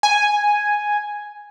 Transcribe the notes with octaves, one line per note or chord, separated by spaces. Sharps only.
G#5